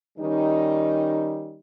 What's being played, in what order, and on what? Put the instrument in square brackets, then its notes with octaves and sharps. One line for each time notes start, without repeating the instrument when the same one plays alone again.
[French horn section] D#3 G3 C#4 D#4